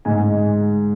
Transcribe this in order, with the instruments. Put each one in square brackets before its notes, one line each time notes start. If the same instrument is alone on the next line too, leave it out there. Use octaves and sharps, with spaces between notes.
[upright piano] G#2 G#3 G#5